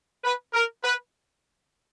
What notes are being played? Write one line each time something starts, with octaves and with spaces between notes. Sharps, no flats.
B4
A#4
B4